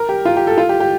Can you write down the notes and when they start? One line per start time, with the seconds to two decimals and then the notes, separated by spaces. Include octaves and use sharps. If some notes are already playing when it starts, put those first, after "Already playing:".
Already playing: A#4
0.09 G4
0.25 F4
0.37 G4
0.47 A4
0.58 F4
0.69 G4
0.80 G4